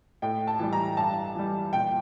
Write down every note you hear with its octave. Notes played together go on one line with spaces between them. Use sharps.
A2 G5
A5
E3 G3
A#5
G2 A5
E3 G3
A#2 G5